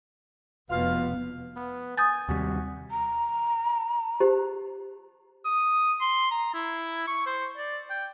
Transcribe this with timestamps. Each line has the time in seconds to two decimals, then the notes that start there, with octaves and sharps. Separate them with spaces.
0.70 F1 B2 B3 F4 F5
1.56 B3
1.98 G#5 D#6 G6 A6
2.29 D#2 C3 G3 F#4
2.91 A#5
4.20 G4 C5
5.45 D#6
6.01 C6
6.31 A#5
6.54 E4
7.07 C#6
7.26 C5
7.57 D5
7.90 G5